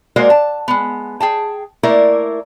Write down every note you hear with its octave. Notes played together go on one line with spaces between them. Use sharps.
G#3 A#3 F#4 A#4 C5 D5
A5
G#3 B3
G#4 G5 A5
A3 A#3 E4 A#4 D5